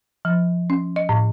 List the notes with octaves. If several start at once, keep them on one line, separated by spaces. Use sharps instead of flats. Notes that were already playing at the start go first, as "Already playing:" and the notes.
F3
C#4
D#5
A2